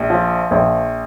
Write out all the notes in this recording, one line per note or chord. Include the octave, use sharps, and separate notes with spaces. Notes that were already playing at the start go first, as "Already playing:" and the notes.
Already playing: A#1
F3
A#1